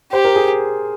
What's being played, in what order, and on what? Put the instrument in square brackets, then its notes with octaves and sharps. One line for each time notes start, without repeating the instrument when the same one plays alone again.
[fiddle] G4 [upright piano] C5
[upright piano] A#4
G#4